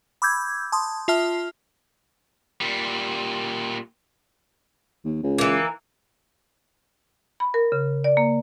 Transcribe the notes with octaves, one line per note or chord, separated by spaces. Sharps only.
B5 D6 E6 G6 G#6
A5 C6 D#6
F4 E5 A5 F6
A#2 G3
D#2
C#2
E3 A#3
B5
A#4
C#3
D5
A#3